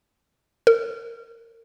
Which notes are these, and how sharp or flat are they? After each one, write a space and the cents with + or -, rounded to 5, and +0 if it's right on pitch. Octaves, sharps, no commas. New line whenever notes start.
A#4 -30